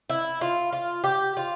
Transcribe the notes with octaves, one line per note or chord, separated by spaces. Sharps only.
E4
F4
F4
G4
F4